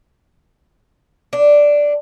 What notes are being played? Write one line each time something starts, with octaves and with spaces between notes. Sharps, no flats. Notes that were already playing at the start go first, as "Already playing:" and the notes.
D4